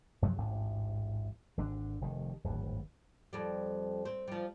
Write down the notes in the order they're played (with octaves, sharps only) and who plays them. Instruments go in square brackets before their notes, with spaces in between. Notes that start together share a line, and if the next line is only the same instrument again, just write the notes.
[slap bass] F#2 C3 F3 F#3
A1 D2 G#2
G#1 D3 D4
F1 C3 D#3
D1 G#1 G2
[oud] F2 G3
C4
F3 G3